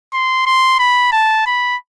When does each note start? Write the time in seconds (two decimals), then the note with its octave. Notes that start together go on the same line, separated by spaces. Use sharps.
0.13 C6
0.46 C6
0.79 B5
1.12 A5
1.46 B5